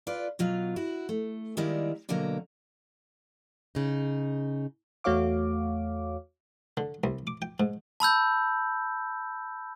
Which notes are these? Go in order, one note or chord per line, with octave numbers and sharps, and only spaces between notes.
F4 B4 D5
B2 F#3 F4
E4 F#4
A3
D#3 G3 G#3 A#3 E4 D5
B2 D3 F#3 A#3
C#3 D#4
E2 A3 F#4 C#5 F5 D6
D3
C2
D6
G5
G#2
A5 B5 E6 G6